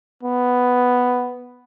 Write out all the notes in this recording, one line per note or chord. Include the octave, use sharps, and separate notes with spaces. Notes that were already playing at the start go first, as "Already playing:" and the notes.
B3